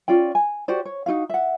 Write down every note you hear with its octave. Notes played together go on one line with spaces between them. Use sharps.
C#4 F4 D5 G5
G#5
F#4 G4 C5 D5
C#5
D#4 F4 F#4 F5
E5 F#5